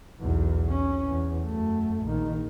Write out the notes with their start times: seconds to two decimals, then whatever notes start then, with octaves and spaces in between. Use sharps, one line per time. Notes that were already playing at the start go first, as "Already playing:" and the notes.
0.20 B1 E2
0.69 C#4
1.07 E2
1.45 F#2 A3
2.02 A#1 D#3